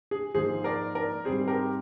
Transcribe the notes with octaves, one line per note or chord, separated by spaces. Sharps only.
G#4
G#2 F3 A#3 G#4 C5
A#4 D5
A#4 D5
G#2 G3 C4 G#4 C5
G4 A#4